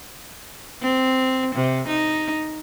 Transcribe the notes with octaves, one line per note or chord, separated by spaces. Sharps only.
C4
C3
D#4